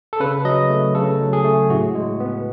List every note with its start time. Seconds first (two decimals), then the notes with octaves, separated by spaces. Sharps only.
0.13 A4
0.20 C#3 B4
0.45 F#3 D#5
0.70 A3
0.95 C#3 A4
1.20 F#3
1.33 G#4
1.45 A3
1.70 A2 F#4
1.95 G#3
2.20 B3